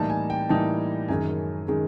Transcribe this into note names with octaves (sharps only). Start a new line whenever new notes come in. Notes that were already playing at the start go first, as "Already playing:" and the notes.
Already playing: A2 E3 G3 A#3 D#4 A5
G#5
G5
A2 E3 G3 A#3 D#4 A5
F#2 D#3 G#3 C#4 G#5
D#3 G#3 C#4